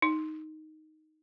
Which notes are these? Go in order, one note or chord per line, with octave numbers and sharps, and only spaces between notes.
D#4